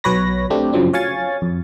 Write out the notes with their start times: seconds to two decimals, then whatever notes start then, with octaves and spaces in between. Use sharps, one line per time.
0.04 B1 F#3 B4 C#5 B5 A#6
0.50 A3 C4 D4 G4
0.73 F#2 C#3 F3 F#3 C4 D4
0.93 C#5 F5 G#5 C#6 A6
1.42 F2